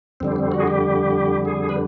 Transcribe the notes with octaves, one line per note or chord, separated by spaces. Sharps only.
F2 D3 G3 C4
C4
F#4
G#4
G4
G#4
B4